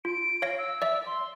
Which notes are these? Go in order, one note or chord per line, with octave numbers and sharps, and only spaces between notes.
F4 D7
C#5 F5 A#6
E6
D5 E5
C6